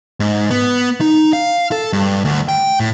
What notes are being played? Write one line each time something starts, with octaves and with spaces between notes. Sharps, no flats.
G#2
B3
D#4
F5
A4
G2
D2
G5
A2